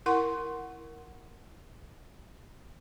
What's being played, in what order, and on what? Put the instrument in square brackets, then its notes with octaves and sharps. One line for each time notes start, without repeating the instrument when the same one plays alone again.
[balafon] E4 A#4 F#5 C6 C#6